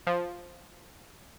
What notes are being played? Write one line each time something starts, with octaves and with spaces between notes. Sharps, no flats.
F3